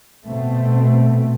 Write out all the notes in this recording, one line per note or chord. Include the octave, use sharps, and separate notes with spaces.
B2 A3 C4